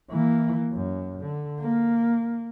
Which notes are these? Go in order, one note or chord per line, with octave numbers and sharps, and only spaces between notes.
E3 A#3
F#2
D3
A#3